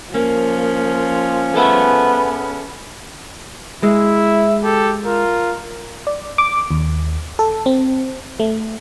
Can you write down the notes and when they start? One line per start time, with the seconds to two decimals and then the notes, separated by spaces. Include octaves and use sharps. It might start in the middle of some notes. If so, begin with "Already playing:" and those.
0.14 F3 A#3 C#4
1.54 B3 G#4 A4 E5
3.83 G#3 E4 E5
4.64 G4 A4
5.05 F4 A#4
6.07 D5
6.38 D6
6.71 D#2
7.39 A4
7.66 C4
8.40 A3